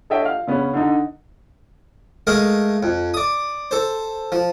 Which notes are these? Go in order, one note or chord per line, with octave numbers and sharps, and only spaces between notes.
A4 C#5 D#5 E5 G5
F5 F6
C#3 B3 C#4
D3 D#4
G#3 A3 A#4 F5 D#6
F2
D5 D#6
A4 C5
F3